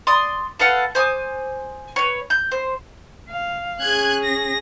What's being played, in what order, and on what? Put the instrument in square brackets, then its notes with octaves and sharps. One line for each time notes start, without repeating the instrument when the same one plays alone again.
[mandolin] D5 C6 D#6
A4 B4 F5 F#5
C5 G#5 D6 D#6
B4 C#5
G6
C5
[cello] F5
[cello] C#4 G#4 [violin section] F#6 G#6
[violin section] A#6